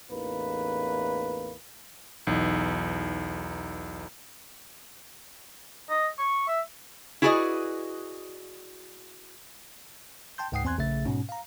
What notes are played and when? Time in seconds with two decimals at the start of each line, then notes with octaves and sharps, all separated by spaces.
0.10 A1 E2 A#3 D#4 B4
2.27 B1 E2 D#4
5.90 D#5
6.19 C#6
6.48 E5
7.22 E4 F#4 G#4 B4 D5 D#5
10.38 G5 A5 C6 G6
10.52 C#2 G#2 F#5 G5 D#6 C7
10.64 E2 C4 G#5 C6 F#6 G#6
10.78 A#1 C#3 A3 E5 A6
11.05 G#2 B2 C#4
11.29 F5 A#5